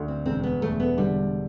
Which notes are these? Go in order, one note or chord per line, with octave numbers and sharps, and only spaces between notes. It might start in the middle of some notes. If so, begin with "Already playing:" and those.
Already playing: D2 D3
C4
E1 C4
B3
E1 A3
B3
D3 G3